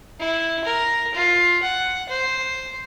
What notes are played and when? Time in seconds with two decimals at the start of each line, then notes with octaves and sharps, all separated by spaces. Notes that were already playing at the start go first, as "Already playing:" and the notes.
0.20 E4
0.64 A#4
1.14 F4
1.63 F#5
2.09 C5